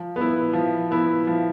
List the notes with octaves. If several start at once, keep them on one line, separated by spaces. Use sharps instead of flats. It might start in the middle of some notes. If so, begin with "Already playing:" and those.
Already playing: F3
B3 E4
F3
B3 E4
F3